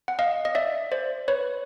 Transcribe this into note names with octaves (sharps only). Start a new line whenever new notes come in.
F#5
D#5 F5
D#5
D5 E5
C5 D5
B4 C#5